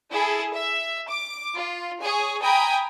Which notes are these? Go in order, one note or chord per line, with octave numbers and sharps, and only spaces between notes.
E4 G#4 A4
E5
D6
F4
G#4 C#5 G#5
G5 G#5 A#5 B5 D#6